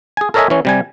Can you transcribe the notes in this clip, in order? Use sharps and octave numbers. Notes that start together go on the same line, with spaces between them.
G#4 G#5
A4 A#4 C#5 D#5 E5 G#5
E3 C#4
C3 G3 G#5